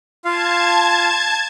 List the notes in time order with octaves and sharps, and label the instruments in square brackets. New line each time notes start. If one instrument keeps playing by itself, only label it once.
[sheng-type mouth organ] F4 F5 [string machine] A5 G#6